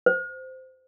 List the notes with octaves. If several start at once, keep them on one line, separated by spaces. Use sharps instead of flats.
C5